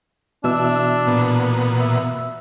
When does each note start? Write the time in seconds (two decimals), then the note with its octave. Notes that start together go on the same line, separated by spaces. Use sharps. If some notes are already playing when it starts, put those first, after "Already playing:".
0.44 B2 E3 D4 E5 E6
1.07 A#2 B3
1.80 E5